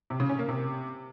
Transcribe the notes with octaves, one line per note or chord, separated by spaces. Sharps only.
C3
C#3
C#4
A#3
C3